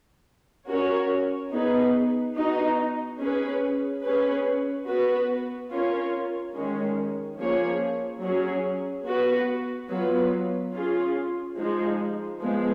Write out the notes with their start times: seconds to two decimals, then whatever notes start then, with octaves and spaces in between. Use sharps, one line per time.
0.68 C#4 F#4 A#4 C#5
1.52 B3 D#4 G#4 B4
2.36 B3 D#4 F#4
3.19 C#4 G#4 B4
4.03 C#4 G#4 B4
4.87 B3 F#4 B4
5.70 C#4 F4 A#4 C#5
6.54 D#3 G#3 C#4
7.37 F3 A#3 C#4 G#4 C#5
8.21 F#3 C#4 G#4
9.05 B3 F#4 B4
9.89 F#3 B3 F4 B4
10.73 C#4 F4 G#4
11.57 F3 G#3 D#4
12.41 F3 G#3 B3